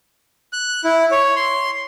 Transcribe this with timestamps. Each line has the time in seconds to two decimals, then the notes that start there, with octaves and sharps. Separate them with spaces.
0.53 F#6
0.84 E4
1.11 C#5
1.36 C6